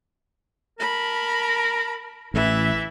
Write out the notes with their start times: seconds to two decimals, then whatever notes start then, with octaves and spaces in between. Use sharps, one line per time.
0.79 A#4 A5 B5
2.34 A1 E3 E4 E5